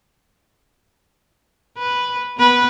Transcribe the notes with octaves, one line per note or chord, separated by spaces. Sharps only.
B4
B3 B4